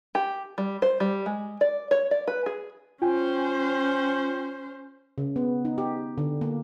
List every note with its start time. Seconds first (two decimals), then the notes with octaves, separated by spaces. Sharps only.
0.15 G4
0.58 G3
0.82 C5
1.00 G3
1.26 G#3
1.61 D5
1.91 C#5
2.11 D5
2.27 B4
2.46 G#4
3.02 C#4 F4 C5 G5 G#5
5.18 C#3
5.36 B3
5.65 D#4
5.78 G4
6.18 D3
6.41 A#3